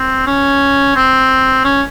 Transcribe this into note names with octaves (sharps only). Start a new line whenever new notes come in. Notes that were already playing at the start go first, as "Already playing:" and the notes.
Already playing: C4
C#4
C4
C#4